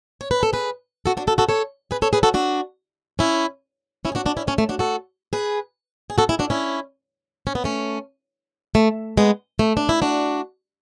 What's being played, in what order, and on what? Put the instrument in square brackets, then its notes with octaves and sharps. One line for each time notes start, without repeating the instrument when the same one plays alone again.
[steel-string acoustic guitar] C#5
B4
A4
G#4 B4
F#4 A4
D4 F#4
F#4 A4
F#4 A4
A4 C#5
G#4 B4
A4 C#5
G#4 B4
F#4 A4
D4 F#4
C#4 E4
C#4 E4
G#4
D4 F#4
D4 F#4
C#4 E4
A3 C#4
A3
D4 F#4
F#4 A4
G#4 B4
G#4
F#4 A4
E4 G#4
D4 F#4
C#4 E4
C#4
B3
A3 C#4
A3
G#3 B3
A3
D4
E4
D4 F#4